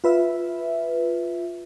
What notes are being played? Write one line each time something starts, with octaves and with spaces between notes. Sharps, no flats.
F4 B4 E5